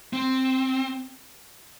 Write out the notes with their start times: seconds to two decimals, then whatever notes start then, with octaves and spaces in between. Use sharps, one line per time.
0.13 C4